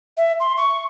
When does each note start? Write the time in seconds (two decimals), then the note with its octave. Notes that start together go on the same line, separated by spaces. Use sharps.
0.17 E5
0.40 C6
0.57 C#6